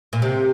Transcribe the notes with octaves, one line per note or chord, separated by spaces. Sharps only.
A#2
C3